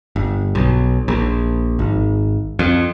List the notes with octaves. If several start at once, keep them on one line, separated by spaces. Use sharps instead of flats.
G1
B1
A#1
G#1
F2